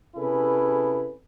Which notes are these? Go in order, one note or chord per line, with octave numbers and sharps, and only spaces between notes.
C3 C#4 E4 G#4 A4 B4